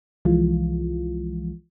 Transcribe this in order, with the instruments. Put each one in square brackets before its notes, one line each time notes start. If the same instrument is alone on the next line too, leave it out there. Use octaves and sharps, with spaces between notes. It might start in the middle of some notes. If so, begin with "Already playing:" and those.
[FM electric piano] C2 E3 F3 G#3 F4